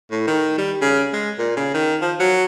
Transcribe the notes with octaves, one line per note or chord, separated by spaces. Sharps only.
A2
D#3
G3
C#3
G#3
A#2
C#3
D#3
F3
F#3